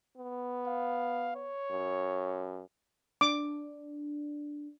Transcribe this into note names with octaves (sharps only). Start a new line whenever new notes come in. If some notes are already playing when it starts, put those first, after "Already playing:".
B3
F5
C#5
F#2
D4 D6